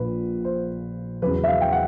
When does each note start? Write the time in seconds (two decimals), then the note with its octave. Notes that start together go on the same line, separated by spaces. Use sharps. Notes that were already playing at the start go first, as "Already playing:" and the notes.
Already playing: A#1 A#2 F3 B4
0.45 C5
1.22 E2 C#3 F#3 B4
1.44 E5
1.47 F5
1.61 G5
1.72 F#5